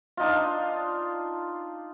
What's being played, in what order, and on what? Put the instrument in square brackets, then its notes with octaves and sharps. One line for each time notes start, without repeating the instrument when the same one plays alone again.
[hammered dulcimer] D4 D#4 F4